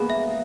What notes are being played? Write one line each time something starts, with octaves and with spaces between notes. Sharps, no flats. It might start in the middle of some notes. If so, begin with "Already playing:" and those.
Already playing: G#3 A#3 B3 G#4
E5